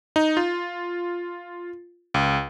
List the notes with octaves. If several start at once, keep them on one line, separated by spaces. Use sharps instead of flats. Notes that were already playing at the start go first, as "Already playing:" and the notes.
D#4
F4
C#2